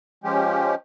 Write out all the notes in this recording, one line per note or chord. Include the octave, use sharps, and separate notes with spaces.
F3 G#3 C#4 G4